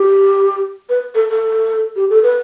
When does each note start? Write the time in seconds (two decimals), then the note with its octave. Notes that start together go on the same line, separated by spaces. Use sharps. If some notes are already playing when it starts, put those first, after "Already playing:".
Already playing: G4
0.89 B4
1.15 A4
1.30 A4
1.96 G4
2.10 A4
2.23 B4